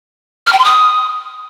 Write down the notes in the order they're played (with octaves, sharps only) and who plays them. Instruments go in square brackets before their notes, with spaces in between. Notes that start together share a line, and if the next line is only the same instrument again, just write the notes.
[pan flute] F6
G5
C6
D#6